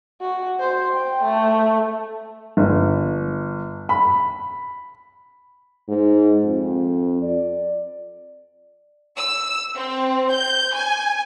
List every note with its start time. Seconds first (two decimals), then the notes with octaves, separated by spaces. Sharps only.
0.21 F#4
0.60 C5
0.93 G5
1.23 A3
2.57 G1
3.89 B5
5.88 G#2
6.44 F2
7.22 D5
9.16 E6
9.76 C4
10.30 G6
10.75 G#5